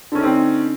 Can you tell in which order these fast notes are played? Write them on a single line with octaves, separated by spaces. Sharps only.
D3 C#4 D#4 C4